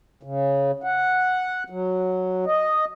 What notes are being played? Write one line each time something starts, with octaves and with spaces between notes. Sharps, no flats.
C#3
F#5
F#3
D#5